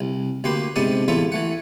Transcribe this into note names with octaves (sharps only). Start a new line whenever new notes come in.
C2
D2 A#3 G4 B4 C6
G#2 C3 B3 D4 A5 D#6
A1 E2 B3 F4 A4 E5
E3 A3 F#5